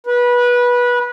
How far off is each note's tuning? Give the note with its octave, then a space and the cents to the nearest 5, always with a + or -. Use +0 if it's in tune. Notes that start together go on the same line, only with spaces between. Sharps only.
B4 -20